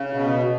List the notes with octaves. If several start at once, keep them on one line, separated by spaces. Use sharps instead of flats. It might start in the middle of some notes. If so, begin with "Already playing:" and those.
Already playing: C#3
B2